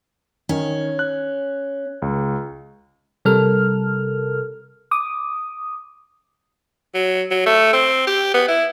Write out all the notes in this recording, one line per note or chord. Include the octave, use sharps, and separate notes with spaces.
D#3 C#4
F#6
C#2
C3 G3 A4 A#4 F6
D6 D#6
F#3
F#3
A3
C4
G4
B3
E4